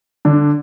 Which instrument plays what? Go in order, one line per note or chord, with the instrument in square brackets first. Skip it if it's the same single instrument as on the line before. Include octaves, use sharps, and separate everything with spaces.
[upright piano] D3 D4